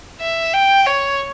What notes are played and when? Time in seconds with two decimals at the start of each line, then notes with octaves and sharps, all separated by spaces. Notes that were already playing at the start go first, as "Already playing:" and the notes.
0.21 E5
0.54 G5
0.86 C#5